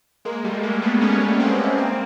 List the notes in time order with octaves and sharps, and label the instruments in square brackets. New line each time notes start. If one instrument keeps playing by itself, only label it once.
[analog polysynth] G#3 A#3
G3 A3
G#3 A#3
A3 B3
B3 C#4
A#3 C4
A#3 C4